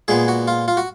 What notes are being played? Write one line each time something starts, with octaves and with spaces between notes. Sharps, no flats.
A#2 G#3 B3 G#4
F#4
F4
F4
F#4